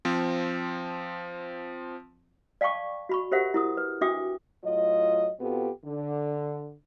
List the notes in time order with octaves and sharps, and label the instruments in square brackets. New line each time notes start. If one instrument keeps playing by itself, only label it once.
[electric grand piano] F3 C4
[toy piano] D5 F5 G5 A5 C#6 D6
F#4 B5 C#6
G4 A#4 C5 E5 F#5
E4 A#4 D#6
B4
D4 F#4 E5 G5 D6 D#6
[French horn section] A2 F#3 F4 D#5
B2 B3 C4 F4 G4 A4
D3